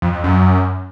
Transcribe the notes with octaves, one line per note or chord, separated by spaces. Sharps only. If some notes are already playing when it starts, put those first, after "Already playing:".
F2
F2
F#2